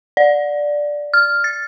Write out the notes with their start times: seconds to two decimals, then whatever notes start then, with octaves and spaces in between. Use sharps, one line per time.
0.17 D5
1.13 F6
1.44 A6